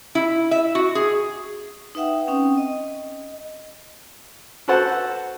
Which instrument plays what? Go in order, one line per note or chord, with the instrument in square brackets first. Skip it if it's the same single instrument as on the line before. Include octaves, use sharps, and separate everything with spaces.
[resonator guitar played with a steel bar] E4
E5
F#4
G#4
[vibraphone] D#4 B4 E5 F#5 G5
C4 C#4 G5 D#6
D#5
[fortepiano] F#4 A4 B4 C5 F#5 A5